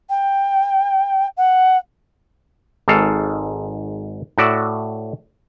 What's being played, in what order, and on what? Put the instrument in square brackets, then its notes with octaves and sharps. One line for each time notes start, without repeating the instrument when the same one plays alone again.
[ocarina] G5
F#5
[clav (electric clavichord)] G#1 G#2 A4 F5
A2 F#4 D5 E5